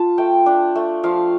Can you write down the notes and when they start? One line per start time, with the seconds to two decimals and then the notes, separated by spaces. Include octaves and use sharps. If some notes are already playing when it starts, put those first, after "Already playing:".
Already playing: F4 A5
0.18 A3 G5
0.46 D4
0.75 A3
1.04 F3 F5